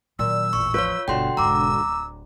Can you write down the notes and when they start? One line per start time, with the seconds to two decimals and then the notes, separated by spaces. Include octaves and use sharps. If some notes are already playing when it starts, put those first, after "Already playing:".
0.19 A#2 D#3 F#3 E6
0.53 A1 E2 C#6
0.74 F3 F4 B4 C#5
1.08 G1 B2 D3 F#4 G5 A5 C6
1.37 E1 G#2 A#5 D6 E6
1.79 D1